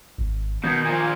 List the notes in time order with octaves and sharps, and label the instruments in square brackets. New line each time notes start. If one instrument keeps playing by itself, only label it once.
[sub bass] G#1
[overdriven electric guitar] B2 [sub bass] D#3 [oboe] D#4 [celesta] G6 G#6
[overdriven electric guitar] A#2 F3 [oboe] G#5